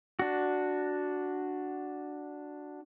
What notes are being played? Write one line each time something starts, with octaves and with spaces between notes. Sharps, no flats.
D4 F#4